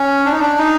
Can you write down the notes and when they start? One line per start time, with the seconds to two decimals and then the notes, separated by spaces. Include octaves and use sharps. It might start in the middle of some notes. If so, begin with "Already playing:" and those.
Already playing: C#4
0.25 D4
0.32 D#4
0.39 D4
0.58 D#4